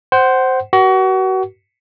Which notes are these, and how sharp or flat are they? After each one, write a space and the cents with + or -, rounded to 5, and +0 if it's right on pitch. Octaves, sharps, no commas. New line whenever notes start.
C5 +0 F#5 +25
F#4 +30 A#4 +40